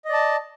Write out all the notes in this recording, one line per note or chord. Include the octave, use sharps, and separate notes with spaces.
D5 D#5 A5